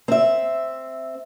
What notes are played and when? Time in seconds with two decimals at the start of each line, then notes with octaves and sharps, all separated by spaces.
0.08 C4 E5